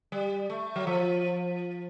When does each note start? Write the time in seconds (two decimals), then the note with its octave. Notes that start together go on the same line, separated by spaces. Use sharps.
0.12 G3
0.50 A3
0.76 F#3
0.87 F3